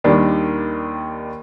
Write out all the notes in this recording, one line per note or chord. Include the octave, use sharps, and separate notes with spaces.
D#2 D#3 G3 D4